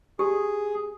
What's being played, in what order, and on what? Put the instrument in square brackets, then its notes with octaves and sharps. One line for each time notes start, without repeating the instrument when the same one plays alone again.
[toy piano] G4 [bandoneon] G#4